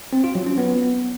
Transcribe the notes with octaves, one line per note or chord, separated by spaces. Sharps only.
C4
F4
F#3
C#4
B3